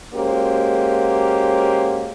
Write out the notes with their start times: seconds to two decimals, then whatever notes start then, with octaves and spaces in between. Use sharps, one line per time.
0.14 G#3 A#3 C#4 F#4 G4 C5